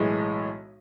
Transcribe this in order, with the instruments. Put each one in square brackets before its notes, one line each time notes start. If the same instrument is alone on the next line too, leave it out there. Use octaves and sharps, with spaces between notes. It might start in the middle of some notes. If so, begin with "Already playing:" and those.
Already playing: [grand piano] B1 A2 E3 G#3 D#5